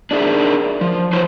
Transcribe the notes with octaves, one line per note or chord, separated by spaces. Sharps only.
D4 D#4 G#4 A#4 E5
F3
E3 E4 C5 C#5